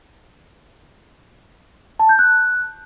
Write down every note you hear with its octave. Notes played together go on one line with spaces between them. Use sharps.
A5
G6
F#6